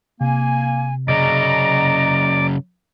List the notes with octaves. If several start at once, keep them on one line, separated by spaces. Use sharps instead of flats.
C3 A#3 G#5
F#2 C#3 D5 D#5 A#5